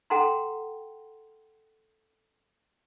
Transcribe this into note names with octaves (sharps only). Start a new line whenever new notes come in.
A4 F#5 G5 A#5 C6